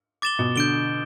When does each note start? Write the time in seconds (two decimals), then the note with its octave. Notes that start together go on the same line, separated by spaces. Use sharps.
0.22 D6 A6 E7 G7
0.39 B2
0.56 D3 G6 D7 G7